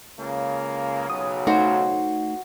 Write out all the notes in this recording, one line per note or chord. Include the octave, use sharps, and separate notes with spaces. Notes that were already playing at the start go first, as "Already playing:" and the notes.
C#2 C#3 A#3
B1 C#3 F#3 D#6
A3 D#4 F#4 C5